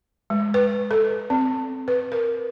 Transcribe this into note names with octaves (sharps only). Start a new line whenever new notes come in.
G#3
B4
A4
C4
B4
A#4